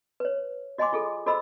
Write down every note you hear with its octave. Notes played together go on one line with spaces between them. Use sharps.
B4 C#5
F#4 D#5 F#5 G#5 C6 D6
F4 G#4 A4
F#4 A4 C5 D#5 B5 E6